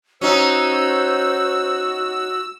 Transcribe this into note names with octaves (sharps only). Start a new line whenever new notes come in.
C#4 D#4 F#4 C5 E6